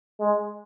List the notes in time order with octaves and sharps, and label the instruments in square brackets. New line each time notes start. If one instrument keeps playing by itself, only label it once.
[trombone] G#3